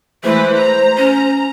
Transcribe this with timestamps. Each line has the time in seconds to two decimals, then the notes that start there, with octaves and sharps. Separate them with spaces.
0.24 E3 G#3 A3 B4 C5
0.57 A#5
0.97 C#4